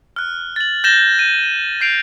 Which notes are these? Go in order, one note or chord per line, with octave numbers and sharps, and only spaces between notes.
F6 F#6
A6 F#7
G6 A6 A#6 E7 G7
D#7
G6 C7 D7 F7